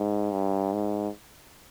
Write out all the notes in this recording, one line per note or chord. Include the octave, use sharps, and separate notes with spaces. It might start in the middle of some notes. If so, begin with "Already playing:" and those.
Already playing: G#2
G2
G#2